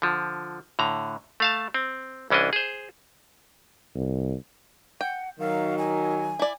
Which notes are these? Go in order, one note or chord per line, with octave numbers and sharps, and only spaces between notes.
D3 F3
A2 D3 A#5
A3 F5 A5
C4
C2 E3 C#4 D4 D#5
G#4 C5
C2
F#5 G5
D#3 F#3 F5
G#5
E4 D5